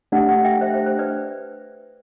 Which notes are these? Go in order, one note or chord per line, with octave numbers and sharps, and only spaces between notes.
A3 D4 G4 D5 F#5
D5 F#5
E5 G5
C5 E5
C5 E5
C5
B4 D5